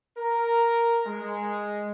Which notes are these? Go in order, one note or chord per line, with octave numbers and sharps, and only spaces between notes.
A#4
G#3